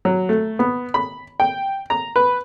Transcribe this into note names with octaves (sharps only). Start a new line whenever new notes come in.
F#3
A3
B3
B5
G5
A#5
B4